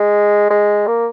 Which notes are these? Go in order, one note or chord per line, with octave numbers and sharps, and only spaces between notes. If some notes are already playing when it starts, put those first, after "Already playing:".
Already playing: G#3
G#3
A#3